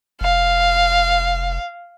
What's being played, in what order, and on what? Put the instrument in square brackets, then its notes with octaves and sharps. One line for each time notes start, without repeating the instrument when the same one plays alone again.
[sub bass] F1 [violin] F5